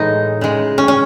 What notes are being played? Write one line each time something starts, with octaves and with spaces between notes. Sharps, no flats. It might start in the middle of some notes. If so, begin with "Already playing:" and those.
Already playing: A2 E3 G#3 D#4
C#3 G#3
C#4
C#4